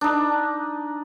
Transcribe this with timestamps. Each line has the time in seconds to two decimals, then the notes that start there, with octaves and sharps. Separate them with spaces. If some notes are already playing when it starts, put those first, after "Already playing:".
0.01 D4 D#4